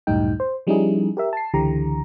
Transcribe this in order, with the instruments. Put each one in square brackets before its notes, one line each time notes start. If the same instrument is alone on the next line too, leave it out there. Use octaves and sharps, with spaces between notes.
[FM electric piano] C#2 F#2 A2 G3 D#4 G5
C5
F3 G3 C#4 D#4 E4 G#4
G4 A#4 E5
A5 C7
C#2 D3 E3 G4 A#5